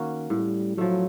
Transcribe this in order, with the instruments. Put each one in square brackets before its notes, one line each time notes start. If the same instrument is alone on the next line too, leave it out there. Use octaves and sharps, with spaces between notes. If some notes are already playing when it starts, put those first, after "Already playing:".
Already playing: [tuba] D#3 [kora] A#3 C#4 F#4
[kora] A2 [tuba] G3
[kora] F3 A3 [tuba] F#3